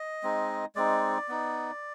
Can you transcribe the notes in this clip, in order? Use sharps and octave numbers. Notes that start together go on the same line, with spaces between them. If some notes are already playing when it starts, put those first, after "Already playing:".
Already playing: D#5
G#3 C4 D#4
G#3 C4 D#4 D5
B3 D#4